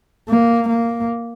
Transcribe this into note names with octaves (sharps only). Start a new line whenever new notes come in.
A#3
A#3